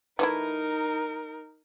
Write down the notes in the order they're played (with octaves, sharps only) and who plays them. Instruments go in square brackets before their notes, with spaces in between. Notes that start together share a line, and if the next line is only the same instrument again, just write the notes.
[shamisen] E3 A3 E4 [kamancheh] D#4 A#4